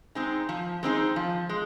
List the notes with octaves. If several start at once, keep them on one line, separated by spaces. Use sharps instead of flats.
G#3 C4 D#4 G#4
F3
G#3 C4 D#4 G#4
F3
G#3